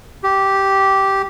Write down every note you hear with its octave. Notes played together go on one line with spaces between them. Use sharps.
G4